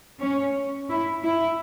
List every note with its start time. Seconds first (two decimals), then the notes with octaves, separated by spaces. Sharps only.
0.21 C#4
0.89 E4
1.23 E4